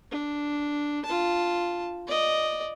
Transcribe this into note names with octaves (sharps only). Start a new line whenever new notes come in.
D4
F4 A5
D5 D#5